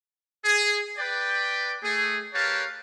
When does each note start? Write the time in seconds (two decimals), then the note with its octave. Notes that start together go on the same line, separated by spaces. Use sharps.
0.45 G#4
0.98 B4 D5 G5
1.84 A3 G#4
2.34 G4 A#4 B4 C#5 F5 A5